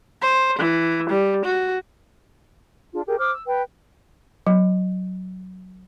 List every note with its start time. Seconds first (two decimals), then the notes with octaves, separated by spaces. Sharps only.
0.22 C5
0.59 E3
1.10 G3
1.45 F#4
2.93 D4 F4 G#4
3.06 G4 G#4 A#4
3.19 C5 D6 D#6 F6
3.33 E6
3.46 B4 G5
4.47 F#3